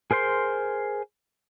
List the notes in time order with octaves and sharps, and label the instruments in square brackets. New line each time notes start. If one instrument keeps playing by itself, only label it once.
[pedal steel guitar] G#4 A#4 C5 C6